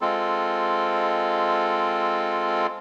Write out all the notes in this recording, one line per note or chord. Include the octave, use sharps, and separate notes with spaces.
G#3 C4 F4 A4